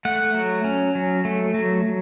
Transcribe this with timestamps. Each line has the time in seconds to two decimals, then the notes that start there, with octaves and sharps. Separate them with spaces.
0.05 A3 F#5
0.34 F#3
0.64 C#4
0.95 F#3
1.25 A3
1.54 F#3
1.85 F#3